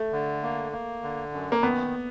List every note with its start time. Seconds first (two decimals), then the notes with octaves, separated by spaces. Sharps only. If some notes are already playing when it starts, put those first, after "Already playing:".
Already playing: A3
0.12 D3
0.42 A#3
0.72 A#3
1.03 D3
1.33 F#2
1.52 A#3
1.63 D#3 B3